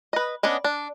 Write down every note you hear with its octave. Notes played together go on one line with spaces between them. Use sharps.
B4 D#5
B3 C#4 D4 D#5
D4